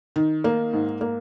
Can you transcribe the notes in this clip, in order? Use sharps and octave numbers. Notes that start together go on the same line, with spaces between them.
D#3
A#3
G#2
A#3